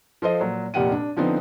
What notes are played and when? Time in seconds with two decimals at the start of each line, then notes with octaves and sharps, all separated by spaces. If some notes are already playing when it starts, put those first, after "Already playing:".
0.22 F3 A4 C5 D#5
0.40 A#2 F#3
0.74 F1 A#2 G4 F#5 D#7
0.92 D4
1.17 D3 F3 B3 C4 D#4